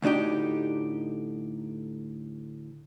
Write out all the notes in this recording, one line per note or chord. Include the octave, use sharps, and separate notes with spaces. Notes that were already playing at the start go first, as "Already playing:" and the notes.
D2 A2 D4 D#4 G4